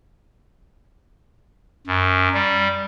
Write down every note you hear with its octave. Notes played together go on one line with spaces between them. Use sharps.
F#2
G3